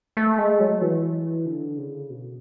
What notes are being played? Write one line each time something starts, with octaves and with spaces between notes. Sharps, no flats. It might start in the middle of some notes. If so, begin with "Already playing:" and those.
A3
G#3
F#3
E3
D3
C#3
B2